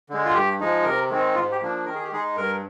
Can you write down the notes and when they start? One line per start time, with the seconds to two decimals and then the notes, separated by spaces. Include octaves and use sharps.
0.10 D3 G#3
0.25 F4
0.34 G2 G4
0.60 F3 G#3 D#4
0.85 C3 A#4
1.10 D#3 G#3 C4 D#4
1.35 G#2 F4
1.52 G4
1.61 F3 A#3 D4
1.85 D#3 A#4
1.95 G#4
2.03 G4
2.12 G#3 D#4 G#4
2.37 G2 A#4